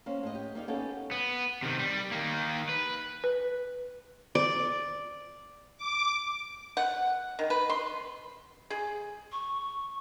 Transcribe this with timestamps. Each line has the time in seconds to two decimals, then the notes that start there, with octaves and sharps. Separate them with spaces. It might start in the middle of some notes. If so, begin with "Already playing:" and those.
0.06 A#3 C4 C#4
0.23 A2 D#5
0.35 G4
0.55 A#3 D#4 D5 F5
0.68 A#3 B3 C#4 D#4 G4 A4
1.11 B3
1.62 C3 D#3
1.79 G3
2.11 D#3 A#3
2.69 B4
3.24 B4
4.35 D5
5.78 D6
6.77 F#5
7.39 D#3
7.50 B4
7.70 C6
8.70 G#4
9.32 C#6